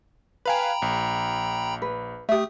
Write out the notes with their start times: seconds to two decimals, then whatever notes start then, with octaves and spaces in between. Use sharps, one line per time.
0.46 B4 F5 G5 G#5 A#5 B5
0.82 A#1
1.82 B4
2.29 A3 G4 E5 D#6